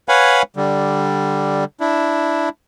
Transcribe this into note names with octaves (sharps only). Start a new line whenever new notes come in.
B4 C#5 F5 F#5 G#5 B5
D3 G3
D4 E4